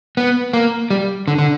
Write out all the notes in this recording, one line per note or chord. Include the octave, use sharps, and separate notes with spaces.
B3
A#3
G3
D3
D3